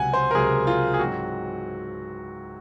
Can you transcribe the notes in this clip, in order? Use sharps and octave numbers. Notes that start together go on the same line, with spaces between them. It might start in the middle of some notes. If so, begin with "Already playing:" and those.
Already playing: C#2 C3 F#3 F#5 G#5
C5
A#4
C#2 C3 F#3 G#4
F4
G#4
G#2 F#3 C4 F#4